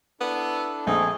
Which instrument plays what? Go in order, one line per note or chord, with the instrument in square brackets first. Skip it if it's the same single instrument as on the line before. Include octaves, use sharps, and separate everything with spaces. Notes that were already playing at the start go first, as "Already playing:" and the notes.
[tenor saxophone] B3 [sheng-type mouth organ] D4 E4 A4
[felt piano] A#1 [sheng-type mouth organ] A3 C4 [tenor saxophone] D#4 [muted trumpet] G#4